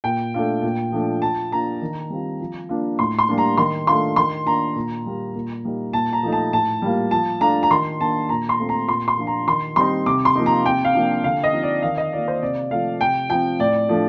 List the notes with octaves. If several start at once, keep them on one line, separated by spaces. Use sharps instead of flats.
A#2 G5
A3 D4 F4
A#2
F3 A3 D4
F3 A5
A#3 D4 F4 A#5
D#3
G3 C4 F4
F3
A#3 D4 F4
A2 C6
C6
G3 A#3 D4
A#5
D#3 C6
A3 D4 F4 C6
D#3 C6
A#3 D4 F4 A#5
A#2
G3 A#3
A#2
G3 A#3 D#4
A#2 A5
A#5
F3 A3 D#4
A5
A2 A5
G3 A#3 F4
F3 A5
A3 D4 F4 A#5
A#5
D#3 C6
A#3 D4 A5
A#2 A#5
C6
A3 C4 F4
A#5
A#2 C6
C6
F3 A#3 D4 F4
A#5
D#3 C6
G3 C4 D#4 C6
C3 D6
C6
F3 A#3 D#4
A#5
C3 G5
F5
F3 A#3 D4 F4
D3 F5
D#5
F3 C4 D#4
D5
D#3 F5
D#5
A#3 F4 D5
C5
C3 D5
F3 A3 F5
C3 G5
F3 C4 G5
A2 D5
F3 A3 D4